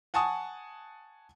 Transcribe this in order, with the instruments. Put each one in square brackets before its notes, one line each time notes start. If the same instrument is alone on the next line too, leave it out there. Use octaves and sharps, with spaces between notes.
[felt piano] F#5 G#5 A5 C#6 D#6